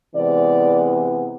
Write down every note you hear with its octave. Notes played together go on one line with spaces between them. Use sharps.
C3 E3 G#3 B3 D5